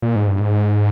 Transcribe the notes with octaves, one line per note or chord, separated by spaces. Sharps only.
A#2
G#2
G2
G#2